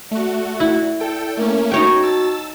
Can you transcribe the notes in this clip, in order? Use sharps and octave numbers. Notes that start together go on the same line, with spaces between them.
A3 F#4 D5
E4
A4 G5
A3 A#3 C#4 A#4
D#4 F#4 C#5 G5
A5 E6 A6